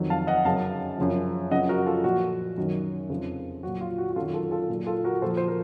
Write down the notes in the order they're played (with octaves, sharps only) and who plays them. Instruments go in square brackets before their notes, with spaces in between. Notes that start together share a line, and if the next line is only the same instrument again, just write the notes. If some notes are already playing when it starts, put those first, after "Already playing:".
Already playing: [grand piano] F2 D#3 F#3
F5 A5
D#5 F#5
F#2 C#3 F#3 F5 A5
F#2 C#3 F3
F#2 C#3 F3 D#5 F#5
F#4 A#4
F4 A4
A#2 F3 F#4
F#2 D#3 F#3
F2 C#3 F3
F#3 F#4
A#2
F4
F#4
F#4
F#2 D#3 F#3 F4 A4
F4 A4
F4 A4
A#2 F#3
F4 A4
F#4 A#4
A#2 F3 A4 C5
C5
A#4